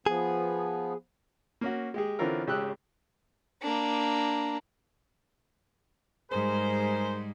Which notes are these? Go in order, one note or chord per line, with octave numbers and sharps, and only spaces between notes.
F3 B3 G#4
A#3 C#4 F#4
G#3 G4 G#4
D3 E3 C4 C#4 F4 A#4
G#1 C#3 G4 G#4 E6 F#6
A#3 D4
G#2 G3 G#4 A#4 C5